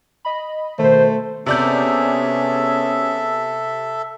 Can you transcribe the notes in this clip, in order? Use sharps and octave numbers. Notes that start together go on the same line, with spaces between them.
D#5 B5
B2 D#3 A3 C5
C3 B3 C#4 G#4 A4 D5 E5 G6